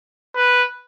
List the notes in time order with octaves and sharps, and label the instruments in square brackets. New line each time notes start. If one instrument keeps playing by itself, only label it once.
[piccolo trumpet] B4